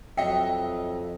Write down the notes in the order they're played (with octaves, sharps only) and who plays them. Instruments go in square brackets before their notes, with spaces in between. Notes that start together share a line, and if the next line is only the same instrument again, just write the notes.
[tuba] F2 [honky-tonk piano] F#3 D#5 E5 [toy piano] G5